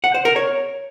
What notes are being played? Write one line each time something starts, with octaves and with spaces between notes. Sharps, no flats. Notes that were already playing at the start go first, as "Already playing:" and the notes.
F#5
C5
A#4
C#5